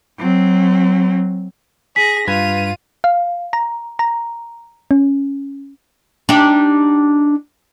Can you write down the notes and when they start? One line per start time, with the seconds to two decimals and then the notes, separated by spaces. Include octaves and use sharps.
0.18 F#3 C4
1.96 G#4 A#6 B6
2.28 G2 F4 B4 G#6 D#7
3.04 F5
3.53 A#5
3.99 A#5
4.91 C#4
6.29 D4 D#4 G4